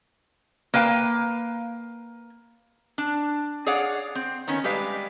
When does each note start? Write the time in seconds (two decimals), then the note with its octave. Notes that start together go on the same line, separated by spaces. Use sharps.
0.74 A#3 B4 F5 G5
2.98 D4
3.66 G#4 C#5 D5 F5 F#5
4.15 C4
4.47 D#3 B3 C#4
4.64 G3 G#3 B4 F5